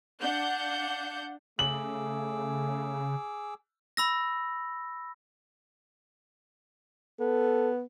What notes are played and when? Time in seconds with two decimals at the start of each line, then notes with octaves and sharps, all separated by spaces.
0.22 D4 F5 F#5 G6
1.59 C#3 A3 G#4 D6 E6 F#7
3.97 B5 E6 A#6
7.20 B3 A4